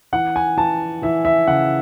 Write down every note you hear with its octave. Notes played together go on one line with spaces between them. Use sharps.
E3 F#5
G#5
E3 A5
E3 E5
E5
C#3 F#5